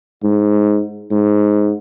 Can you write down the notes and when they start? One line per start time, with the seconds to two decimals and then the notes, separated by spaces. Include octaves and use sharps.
0.23 G#2
1.11 G#2